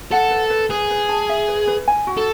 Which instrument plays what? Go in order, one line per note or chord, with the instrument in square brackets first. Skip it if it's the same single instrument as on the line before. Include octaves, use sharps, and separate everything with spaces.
[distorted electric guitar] A4 [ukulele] F#5
[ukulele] B4
B4
[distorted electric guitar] G#4 [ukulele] B4
[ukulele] B4
A5
E5
B4
B4
G#5
F#4
[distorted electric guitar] A4